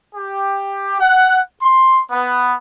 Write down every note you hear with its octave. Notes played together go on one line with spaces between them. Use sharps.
G4
F#5
C6
B3